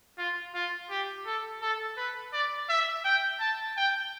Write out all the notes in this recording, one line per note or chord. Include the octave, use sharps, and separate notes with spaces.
F4
F4
G4
A4
A4
B4
D5
E5
G5
A5
G5